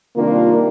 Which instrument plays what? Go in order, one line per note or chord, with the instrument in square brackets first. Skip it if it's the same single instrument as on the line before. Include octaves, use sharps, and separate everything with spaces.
[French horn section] C3 D#3 G3 D4 F4 [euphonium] A#3